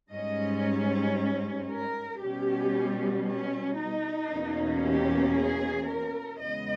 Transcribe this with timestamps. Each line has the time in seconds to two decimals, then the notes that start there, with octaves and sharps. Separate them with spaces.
0.12 G#2 G3 C#4 D#5
1.69 A#4
2.21 B2 G3 C#4 G4
3.26 C#4
3.78 D#4
4.30 E2 B2 A#3 C#4
4.82 G4
5.34 G#4
5.87 A#4
6.39 E2 C#3 G#3 B3 D#5